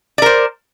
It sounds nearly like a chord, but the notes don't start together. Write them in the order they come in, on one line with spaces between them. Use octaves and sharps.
D5 A#4 C5